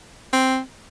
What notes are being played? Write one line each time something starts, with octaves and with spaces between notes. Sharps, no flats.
C4